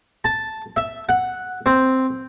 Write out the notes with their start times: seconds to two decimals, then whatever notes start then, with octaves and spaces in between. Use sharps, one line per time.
0.24 A5
0.77 E5
1.09 F#5
1.66 C4